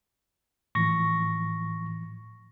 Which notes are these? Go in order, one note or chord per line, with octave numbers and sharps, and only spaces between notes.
A2 E3 F3 C#6 A#6